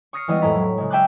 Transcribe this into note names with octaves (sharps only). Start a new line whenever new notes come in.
C#6 D#6 F6 A#6 C7 C#7
E3 G3 G#3 B3 E4 D#5
F2 A2 G#3 E4 A#5 B6
F#3
C#3 G#3
E5 G5 G#5 C6 D6 F#6